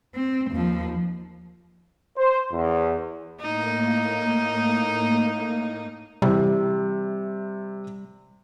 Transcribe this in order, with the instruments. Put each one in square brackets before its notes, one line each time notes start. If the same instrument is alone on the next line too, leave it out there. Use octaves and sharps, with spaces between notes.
[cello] C4
D#2 F3
[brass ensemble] C5
E2
[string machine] A2 A#3 [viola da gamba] D#4
[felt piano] C3 E3 [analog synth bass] G3